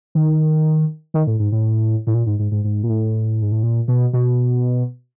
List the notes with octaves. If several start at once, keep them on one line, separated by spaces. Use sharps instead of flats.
D#3
D#3
A2
G#2
A2
A2
A#2
G#2
G#2
G#2
G#2
A#2
A2
G#2
A2
A#2
B2
B2